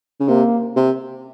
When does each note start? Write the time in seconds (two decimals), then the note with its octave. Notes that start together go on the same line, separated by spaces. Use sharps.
0.20 C#3
0.28 C3 A#3
0.77 C3